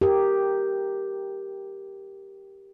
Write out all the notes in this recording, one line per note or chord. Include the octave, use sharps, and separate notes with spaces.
G4 A#4